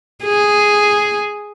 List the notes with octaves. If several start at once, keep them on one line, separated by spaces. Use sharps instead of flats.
G#4